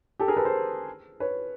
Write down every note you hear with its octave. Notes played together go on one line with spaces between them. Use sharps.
G4 A4
G#4 A#4
A4 B4
A#4 C5
B4 C#5